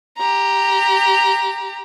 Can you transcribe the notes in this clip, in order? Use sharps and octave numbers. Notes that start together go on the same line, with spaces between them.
G4 A#5